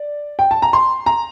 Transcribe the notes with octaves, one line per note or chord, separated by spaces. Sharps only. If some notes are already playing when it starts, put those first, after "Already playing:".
Already playing: D5
G5
A5
A#5
C6
A#5